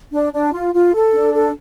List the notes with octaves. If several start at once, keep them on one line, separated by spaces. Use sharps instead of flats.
D4
D4
F4
F4
A4
D4
A4